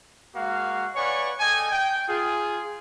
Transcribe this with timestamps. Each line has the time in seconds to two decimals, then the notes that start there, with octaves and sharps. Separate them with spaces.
0.35 G#3 A#3 F#4 F5
0.95 B4 C#5 D5 F#5 G#5 C#6
1.40 A4 D#5 G5 G#5
1.71 G5
2.08 F4 G#4